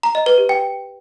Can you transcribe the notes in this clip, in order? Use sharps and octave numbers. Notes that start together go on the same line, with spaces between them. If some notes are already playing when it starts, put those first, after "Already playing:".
A#5
D#5
B4
G4
G5